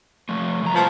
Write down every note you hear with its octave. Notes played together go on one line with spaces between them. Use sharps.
F3 A3
C2 A#5
C3 F3 B4